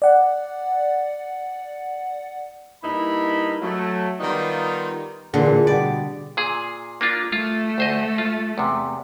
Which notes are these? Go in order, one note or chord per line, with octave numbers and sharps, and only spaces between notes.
D5 F#5
G2 A#3 D#4 E4 B5
F#3 A3
D#3 G3 B3 D#4 F4
A#2 D3 E3 G#4
B2 G3 B3 D5
A#2 G#4
A#3 D4 F4
A3 F4
D2 C5 D#5
F4
E2 C3